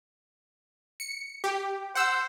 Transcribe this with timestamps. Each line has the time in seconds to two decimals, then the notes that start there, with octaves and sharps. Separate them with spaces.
1.00 C#7
1.44 G4
1.95 C5 F#5 E6